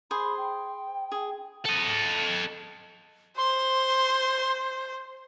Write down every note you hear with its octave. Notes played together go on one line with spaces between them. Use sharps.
G#4 C5 B5
G5
G#4
A4 D#5
C5 C6